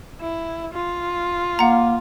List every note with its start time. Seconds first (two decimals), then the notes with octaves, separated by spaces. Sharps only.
0.21 E4
0.73 F4
1.59 A#3 F#5 A#5